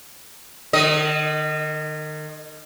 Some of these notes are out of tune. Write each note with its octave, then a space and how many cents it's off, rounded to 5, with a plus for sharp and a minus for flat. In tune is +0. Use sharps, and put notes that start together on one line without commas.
D#3 -35 D#5 +0